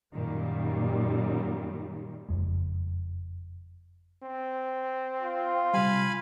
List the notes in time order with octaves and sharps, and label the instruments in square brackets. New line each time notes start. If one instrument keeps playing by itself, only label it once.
[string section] F#2 A#2 D#3 G3
[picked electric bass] F#1 F2 G#3
[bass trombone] C4
[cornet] F4
[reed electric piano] C3 G3 [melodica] F5 G#5 B5